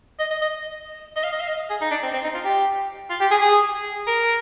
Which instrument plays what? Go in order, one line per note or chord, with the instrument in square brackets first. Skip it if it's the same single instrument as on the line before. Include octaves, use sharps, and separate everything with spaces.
[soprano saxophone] D#5
D#5
D#5
D#5
F5
D#5
F5
D#5
G#4
D#4
D4
C4
C4
D#4
F4
G4
F4
G4
G#4
G#4
A#4